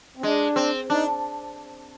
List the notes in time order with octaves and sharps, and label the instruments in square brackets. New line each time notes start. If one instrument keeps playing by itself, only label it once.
[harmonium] C4
[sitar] G#3 [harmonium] D4
[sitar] C4
[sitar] D4 [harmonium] D#4